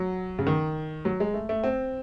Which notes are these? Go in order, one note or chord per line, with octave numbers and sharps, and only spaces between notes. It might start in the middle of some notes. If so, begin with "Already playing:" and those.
Already playing: F#3
C#3
D#3
F#3
G#3
A3
A3
C4